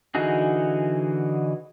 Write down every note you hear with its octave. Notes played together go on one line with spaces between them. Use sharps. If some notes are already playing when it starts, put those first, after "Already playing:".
D3 E3 D#4 F#4 G#4